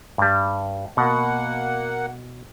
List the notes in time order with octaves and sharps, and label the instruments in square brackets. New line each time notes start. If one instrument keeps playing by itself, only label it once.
[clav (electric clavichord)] G2 G3
[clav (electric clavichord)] B2 [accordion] A#3 F#5